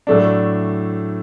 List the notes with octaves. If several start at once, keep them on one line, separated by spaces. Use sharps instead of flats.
A2 F#3 A3 D4